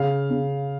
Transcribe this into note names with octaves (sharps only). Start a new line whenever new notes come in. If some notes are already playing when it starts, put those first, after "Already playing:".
Already playing: C#3 F5
C#3